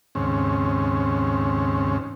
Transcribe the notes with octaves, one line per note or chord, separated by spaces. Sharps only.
D#2 G#2 C#3 C4 C#4